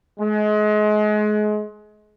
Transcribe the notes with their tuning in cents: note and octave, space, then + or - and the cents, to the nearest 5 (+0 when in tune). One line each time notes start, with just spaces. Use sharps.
G#3 +30